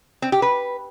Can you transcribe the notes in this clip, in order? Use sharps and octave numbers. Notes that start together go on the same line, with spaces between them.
C4
G4
B4